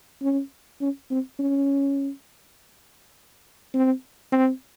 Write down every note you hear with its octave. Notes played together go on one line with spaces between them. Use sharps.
C#4
C#4
C4
C#4
C4
C4